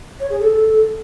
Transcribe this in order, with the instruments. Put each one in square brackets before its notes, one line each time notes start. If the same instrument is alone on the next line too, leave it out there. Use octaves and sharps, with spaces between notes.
[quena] C#5
G#4
A4